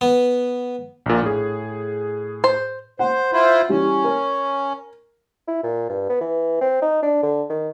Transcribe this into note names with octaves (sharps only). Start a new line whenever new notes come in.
B3
A#1 A#2
A2 G#4
C5
C5 F#5
E4 F4 C5
E3 G3 C#4
A#4
E4
A#2
G2
B3
E3
C4
D#4
D4
D3
D#3